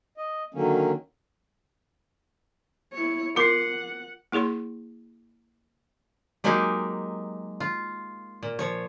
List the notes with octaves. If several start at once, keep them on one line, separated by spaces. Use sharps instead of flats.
D#5
D3 D#3 F#3 A#3 C#4
E4 C#5
F4 A#4 F#5 C6 D6 B6 C7
A#3 E4 G#4 C#5 C6
F#3 G#3 A#3 D#4 G4 G#4
F4
A#2
F3 C#5